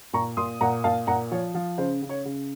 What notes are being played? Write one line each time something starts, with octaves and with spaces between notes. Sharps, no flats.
A#2 A#5 C#6
A#2 C6 D#6
A#2 F#5 A#5
A#2 F5 A5
A#2 F#5 A#5
F3 C#5
F3
C#3 C5
C#3
C#5
C#3